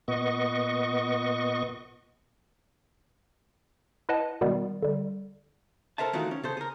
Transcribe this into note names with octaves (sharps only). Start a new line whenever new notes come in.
A#2 B3 D#5 C#6
E4 B4 D#5 F#5 A5
B2 D#3 G3 G#3 B3
D3 G3
A4 A#4 C5 E5 A5
D#3 E3 A3 F4 F#4 A#4
C#4
C#3 A4 C5
G#4 A#4